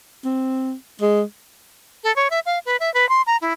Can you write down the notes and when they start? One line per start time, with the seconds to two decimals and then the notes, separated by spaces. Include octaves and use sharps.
0.25 C4
1.02 G#3
2.04 A4
2.16 C#5
2.30 E5
2.46 F5
2.66 B4
2.80 E5
2.94 B4
3.09 C6
3.27 A#5
3.41 E4